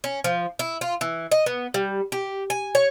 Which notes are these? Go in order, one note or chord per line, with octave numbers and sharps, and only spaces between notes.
C#4
F3
E4
F4
E3
D#5
B3
G3
G4
G#5
C#5